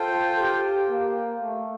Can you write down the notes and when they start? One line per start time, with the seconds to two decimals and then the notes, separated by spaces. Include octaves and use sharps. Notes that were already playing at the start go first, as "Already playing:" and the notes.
Already playing: F4 A4 C5 G5
0.40 G4
0.90 A#3
1.41 A3